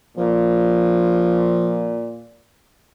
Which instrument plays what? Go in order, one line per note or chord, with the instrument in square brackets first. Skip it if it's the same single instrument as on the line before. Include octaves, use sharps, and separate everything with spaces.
[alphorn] A#2 [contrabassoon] F3